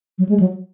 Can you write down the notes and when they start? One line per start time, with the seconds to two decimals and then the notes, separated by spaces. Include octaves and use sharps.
0.18 F#3
0.29 G#3
0.40 F#3